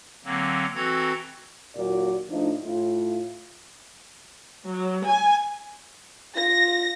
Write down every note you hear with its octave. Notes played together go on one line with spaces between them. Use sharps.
D3 F#3 A#3 C4
E3 C4 F#4 A4 A#5 G#6
D#2 A#2 F#3 D5
A2 F3 D4 D#4
A2 F4
F#3
G#5
F4 A#6